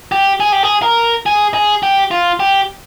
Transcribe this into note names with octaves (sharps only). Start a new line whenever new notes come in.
G4
G#4
G4
G#4
A#4
G#4
G#4
G4
F4
G4